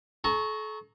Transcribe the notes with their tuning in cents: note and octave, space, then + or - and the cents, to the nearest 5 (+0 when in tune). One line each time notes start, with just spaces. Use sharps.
A4 -40 A#5 +0 C#6 -5